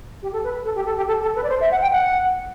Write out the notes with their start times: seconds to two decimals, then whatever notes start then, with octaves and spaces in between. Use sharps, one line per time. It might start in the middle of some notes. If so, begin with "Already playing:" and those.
0.22 G4
0.33 A4
0.44 B4
0.65 A4
0.76 G4
0.86 A4
0.97 G4
1.07 A4
1.22 A4
1.36 B4
1.43 D5
1.49 C5
1.61 E5
1.71 F#5
1.82 G5
1.92 F#5